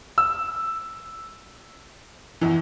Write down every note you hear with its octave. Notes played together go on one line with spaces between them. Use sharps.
E6
E2 E3